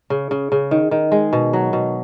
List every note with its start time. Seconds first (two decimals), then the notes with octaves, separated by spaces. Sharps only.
0.10 C#3
0.31 C#3
0.52 C#3
0.71 D#3
0.91 D#3
1.12 G#3
1.33 B2
1.53 F#3
1.73 B2